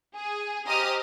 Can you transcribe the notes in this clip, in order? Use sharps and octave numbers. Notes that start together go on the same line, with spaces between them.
G#4
G4 C5 D#5 A#5 D#6 F6